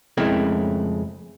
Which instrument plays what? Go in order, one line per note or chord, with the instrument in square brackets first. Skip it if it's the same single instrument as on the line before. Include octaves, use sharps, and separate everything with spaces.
[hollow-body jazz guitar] F2 C#3 G#3 A3 E4 A#4